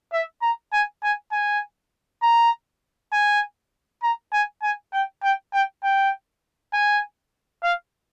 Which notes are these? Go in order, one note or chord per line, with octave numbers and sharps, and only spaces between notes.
E5
A#5
G#5
G#5
G#5
A#5
G#5
A#5
G#5
G#5
G5
G5
G5
G5
G#5
F5